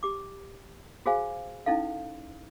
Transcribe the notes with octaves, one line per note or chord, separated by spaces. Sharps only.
G4 D6
F#4 G#4 C5 F5 G#5
C#4 D#4 E4 A4 F5